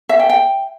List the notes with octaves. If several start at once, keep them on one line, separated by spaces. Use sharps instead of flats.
E5
G5
G5